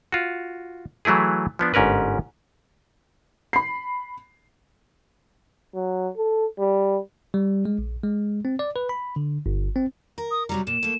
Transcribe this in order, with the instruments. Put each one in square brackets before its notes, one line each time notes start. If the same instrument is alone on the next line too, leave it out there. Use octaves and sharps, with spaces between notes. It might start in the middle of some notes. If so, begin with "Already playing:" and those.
[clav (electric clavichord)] F4 F#4
E3 F#3 A3 E4 G#4
F3 B3 D4
G1 G#2 C#4 A#4 B4
[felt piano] B5 C7
[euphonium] F#3
A4
G3
[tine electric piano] G3
G#3
A#1
G#3
C4
D5
B4
B5
D3
G1
C4
[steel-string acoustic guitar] A#4
[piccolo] D#6
[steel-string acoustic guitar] C3 F#3 G3 [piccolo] A#5
[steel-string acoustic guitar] A#2 [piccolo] E7
[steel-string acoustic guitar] A3 A#3